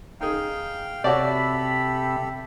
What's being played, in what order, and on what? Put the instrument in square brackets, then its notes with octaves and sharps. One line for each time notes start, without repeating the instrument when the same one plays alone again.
[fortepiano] D#4 G#4 [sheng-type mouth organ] F5 G5
[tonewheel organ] C3 E5 B5 [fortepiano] F#4 C#5 D5 [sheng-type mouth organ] G4 A4